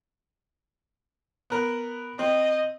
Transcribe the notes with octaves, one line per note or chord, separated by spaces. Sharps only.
B3 A#4 F#6
C4 D#5